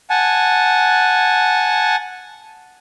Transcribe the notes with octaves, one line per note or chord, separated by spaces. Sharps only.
F#5 G#5 A5